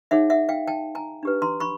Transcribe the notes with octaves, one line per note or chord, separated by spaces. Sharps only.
D#4 G#4 C#5 E5 F#5
E5 F#5
F5 G5
G5 A5
G#5 A#5
D4 G4 B4
A#5 C6
B5 C#6